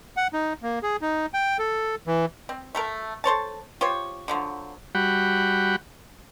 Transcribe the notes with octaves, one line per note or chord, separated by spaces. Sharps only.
F#5
D#4
A#3
G#4
D#4
G5
A4
E3
C4
A3 A4 A#4
A4 C5 C#5 A5
F4 G4 C5 C#5
D3 F3 F#3
G3 F#4 F#5 G5 B5